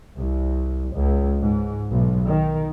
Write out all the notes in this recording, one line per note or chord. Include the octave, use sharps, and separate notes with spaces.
C2
C#2
G#2
B1
D#3